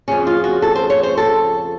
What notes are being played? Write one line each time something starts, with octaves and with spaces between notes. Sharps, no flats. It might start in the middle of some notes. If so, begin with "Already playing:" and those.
F2 C#3 C#4
F4
F#4
A4
C5
C#5
C5
A4